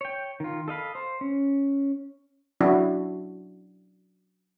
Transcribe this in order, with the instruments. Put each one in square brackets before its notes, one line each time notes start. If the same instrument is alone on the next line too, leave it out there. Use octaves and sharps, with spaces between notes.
[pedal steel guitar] C#5 G5
D#3 F4
A4 D#5 F5 B5
C5
C#4
[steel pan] F#3 D4 E4 F#4